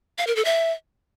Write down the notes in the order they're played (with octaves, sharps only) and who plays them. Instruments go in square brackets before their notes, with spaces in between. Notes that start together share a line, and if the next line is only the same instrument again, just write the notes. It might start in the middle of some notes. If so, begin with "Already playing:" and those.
[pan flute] F5
A#4
A4
E5